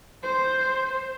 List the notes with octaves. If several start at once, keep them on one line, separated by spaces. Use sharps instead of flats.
C5